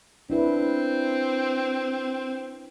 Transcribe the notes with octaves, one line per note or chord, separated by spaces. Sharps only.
C4 D4 E4 B4